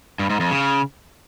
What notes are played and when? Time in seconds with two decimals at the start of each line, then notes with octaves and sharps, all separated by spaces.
0.19 G2
0.30 G#2
0.40 F2
0.51 C#3